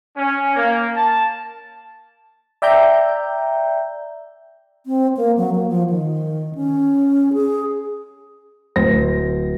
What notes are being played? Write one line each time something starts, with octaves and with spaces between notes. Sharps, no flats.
C#4
A#3
A5
D5 E5 G5 A#5 G6
C4
A#3
F#3
A#3
F3
D#3
C#4
G#4
D1 C5 A#6